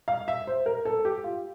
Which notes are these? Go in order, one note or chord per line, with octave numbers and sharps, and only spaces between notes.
F5
E5
C5
A#4
A4
G4
F4